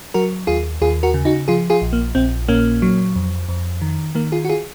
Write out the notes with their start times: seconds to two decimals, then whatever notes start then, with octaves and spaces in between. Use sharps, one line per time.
0.14 F#3 F#4 A#4
0.47 D#2 F4 G#4
0.81 D#2 F4 G#4
1.03 F#4 A#4
1.14 C#3
1.25 D#4 F#4
1.48 F3 F4 G#4
1.70 F4 G#4
1.82 A#1
1.93 A#3
2.15 A#1 C4
2.48 A#2 A#3 C#4
2.82 F#3
3.16 F2
3.49 F2
3.82 D#3
4.15 D#3 A#3
4.32 F4 G#4
4.45 F#4
4.49 F4 G#4